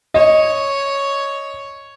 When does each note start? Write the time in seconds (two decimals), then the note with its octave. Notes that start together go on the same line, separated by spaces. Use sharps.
0.14 C#5 D#5